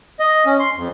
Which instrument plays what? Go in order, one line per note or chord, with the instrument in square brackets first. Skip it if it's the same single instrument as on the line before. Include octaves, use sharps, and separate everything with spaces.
[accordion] D#5
C#4
C6
F2